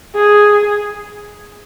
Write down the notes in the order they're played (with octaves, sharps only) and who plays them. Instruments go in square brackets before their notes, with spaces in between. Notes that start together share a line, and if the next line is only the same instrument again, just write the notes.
[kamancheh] G#4